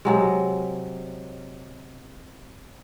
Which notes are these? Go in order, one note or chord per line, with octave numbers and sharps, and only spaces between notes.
C3 F#3 G#3